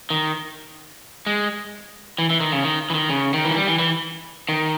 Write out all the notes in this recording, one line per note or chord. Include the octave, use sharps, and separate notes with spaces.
D#3
G#3
E3
E3
D#3
C#3
D#3
E3
D#3
C#3
D#3
E3
G3
E3
E3
D#3